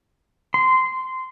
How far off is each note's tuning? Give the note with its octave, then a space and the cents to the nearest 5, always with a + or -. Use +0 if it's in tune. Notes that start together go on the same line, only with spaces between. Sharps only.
C6 -15